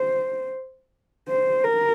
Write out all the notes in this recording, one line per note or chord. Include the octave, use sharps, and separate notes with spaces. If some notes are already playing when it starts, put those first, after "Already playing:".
Already playing: C5
C5
A#4